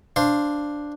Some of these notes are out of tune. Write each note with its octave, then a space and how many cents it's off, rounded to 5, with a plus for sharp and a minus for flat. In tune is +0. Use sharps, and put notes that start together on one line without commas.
D4 +0 C5 +0 F5 -15